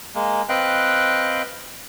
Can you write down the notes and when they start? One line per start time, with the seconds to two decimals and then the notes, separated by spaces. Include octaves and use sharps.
0.15 G#3 A#3
0.49 C4 B4 D#5 F5 G5 F#6